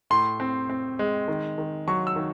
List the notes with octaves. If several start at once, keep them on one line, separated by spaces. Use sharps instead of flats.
A2 C6
C4
C4
G#3
D#3
D#3
F#3 C#6
E6
D#3